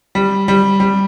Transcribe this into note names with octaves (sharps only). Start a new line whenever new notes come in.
G3
G3
G3